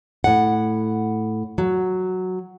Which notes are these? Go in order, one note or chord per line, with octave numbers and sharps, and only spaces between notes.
A2 F#5
F#3